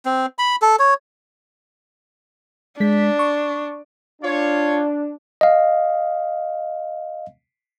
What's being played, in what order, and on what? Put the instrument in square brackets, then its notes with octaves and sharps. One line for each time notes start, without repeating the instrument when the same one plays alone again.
[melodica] C4
B5
A4
C#5
[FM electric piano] G#3 B6 [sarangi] D4
[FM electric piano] C#6
[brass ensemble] D4 [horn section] F4 C#5
[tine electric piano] D#5 F5